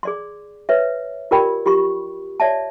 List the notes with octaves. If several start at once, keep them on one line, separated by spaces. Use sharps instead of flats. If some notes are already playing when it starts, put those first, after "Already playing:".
G#4 D5 C6
B4 C#5 E5
F4 G4 A#4 D5 G5 B5
F4 G4 C6 C#6
C#5 D5 E5 A5